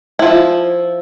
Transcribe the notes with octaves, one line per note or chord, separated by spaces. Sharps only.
F3 E4